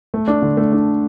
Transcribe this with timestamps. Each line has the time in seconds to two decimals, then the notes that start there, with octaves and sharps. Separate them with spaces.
0.14 A3
0.28 D4
0.42 D3
0.57 A3
0.72 D4